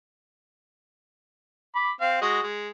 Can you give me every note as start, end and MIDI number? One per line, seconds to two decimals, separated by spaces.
1.75 1.92 83
1.75 1.92 86
2.01 2.19 60
2.01 2.19 77
2.21 2.41 56
2.21 2.41 66
2.21 2.41 75
2.42 2.69 56